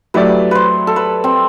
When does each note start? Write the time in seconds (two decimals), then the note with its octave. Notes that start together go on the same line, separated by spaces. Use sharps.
0.14 F#3 A3 E4 G4 B4 D5
0.51 B4 C5
0.87 A4
0.96 B4
1.24 C4